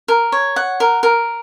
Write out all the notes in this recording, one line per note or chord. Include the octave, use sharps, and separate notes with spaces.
A#4
C#5
F#5
A#4
A#4